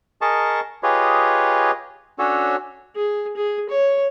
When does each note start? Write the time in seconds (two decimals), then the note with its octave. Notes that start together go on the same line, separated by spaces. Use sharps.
0.22 G#4 A#4 D#5 A5 C#6
0.83 F4 G4 G#4 B4 C#5 D#5
2.19 C#4 D4 F#4 A4 C#5
2.96 G#4
3.37 G#4
3.69 C#5